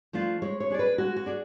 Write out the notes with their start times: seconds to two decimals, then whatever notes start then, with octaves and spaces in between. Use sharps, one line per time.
0.13 F3 A3 D4 F4
0.42 G#3 C#5
0.60 C#5
0.70 D4 G#4 D5
0.79 B4
0.98 G#3 F#4
1.16 F#4
1.26 D4 G#4 D5